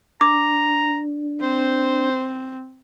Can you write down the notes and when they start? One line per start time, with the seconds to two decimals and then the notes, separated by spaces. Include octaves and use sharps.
0.21 D4 A#5 D6
1.42 C4 C5